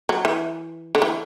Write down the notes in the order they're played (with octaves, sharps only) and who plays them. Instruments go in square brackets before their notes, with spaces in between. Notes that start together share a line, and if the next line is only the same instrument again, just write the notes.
[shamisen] F#3
E3
D3
E3